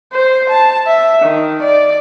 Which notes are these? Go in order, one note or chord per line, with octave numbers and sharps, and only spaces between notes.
C5
A5
E5
D#3
D5